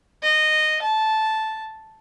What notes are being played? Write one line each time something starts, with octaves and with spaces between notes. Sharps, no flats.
D#5
A5